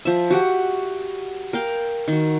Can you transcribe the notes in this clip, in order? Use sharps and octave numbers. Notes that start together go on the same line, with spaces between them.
F3 E5
F#4 G4 F#5
A#4 F5 G5
D#3 F#4